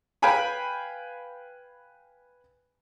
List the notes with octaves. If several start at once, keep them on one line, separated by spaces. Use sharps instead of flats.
B4 F5 G5 G#5 B5